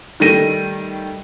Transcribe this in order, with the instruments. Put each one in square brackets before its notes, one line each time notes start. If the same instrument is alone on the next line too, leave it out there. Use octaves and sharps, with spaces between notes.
[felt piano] D#3 G3 A3 G5 A#6 D#7